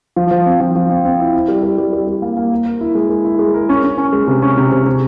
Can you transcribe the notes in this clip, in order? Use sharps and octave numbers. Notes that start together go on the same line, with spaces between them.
F3
F3
C4
F3
F3
C4
C4
E4
E4
G3
G3
G3
G3
G3
A#3
A#3
A#4
A#4
E4
G#3
G#3
E4
G#3
A#4
C#4
C#4
C#4
G#3
C3
C#4
C3
C3
C3